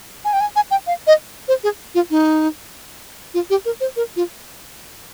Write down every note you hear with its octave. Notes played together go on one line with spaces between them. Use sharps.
G#5
G5
G#5
G#5
G5
F5
D#5
C5
G#4
F4
D#4
F4
G4
A#4
C5
A#4
F4